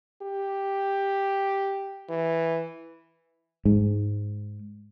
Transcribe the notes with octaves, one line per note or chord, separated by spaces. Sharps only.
G4
E3
G#2